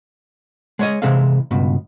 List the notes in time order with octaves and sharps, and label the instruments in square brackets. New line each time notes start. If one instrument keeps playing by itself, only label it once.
[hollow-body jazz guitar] G#3 C#5 D#5
C3 E3 G#3 C4 F5
C#2 G2 B2